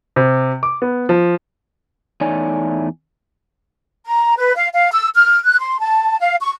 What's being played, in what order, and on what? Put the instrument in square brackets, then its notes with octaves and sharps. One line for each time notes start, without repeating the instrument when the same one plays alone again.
[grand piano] C3
D6
B3
F3
[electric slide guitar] E2 A3 D#4 C#5 D5 G#5
[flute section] A#5
B4
F5
F5
E6
F6
F#6
C6
A5
F5
C#6